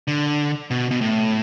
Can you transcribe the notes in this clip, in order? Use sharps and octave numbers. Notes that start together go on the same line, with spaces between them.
D3
B2
B2
A2